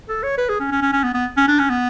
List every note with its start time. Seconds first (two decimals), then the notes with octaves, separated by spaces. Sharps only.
0.09 A4
0.23 C#5
0.38 B4
0.49 G#4
0.60 C#4
0.71 C#4
0.82 C#4
0.92 C#4
1.04 B3
1.14 B3
1.37 C#4
1.48 D4
1.59 C#4
1.70 B3